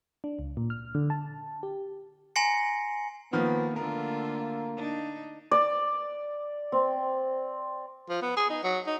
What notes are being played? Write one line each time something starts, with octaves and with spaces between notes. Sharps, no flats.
D4
C#2
A#2
F6
D3
A5
G4
G#5 A#5 C6 A#6 C7 C#7
D#3 F3 A#3 B3 F6
D3 A3 A#3 F4 A#4
D4 D#4
D5
C4
F3
B3
G#4
D#4
F#3
D#4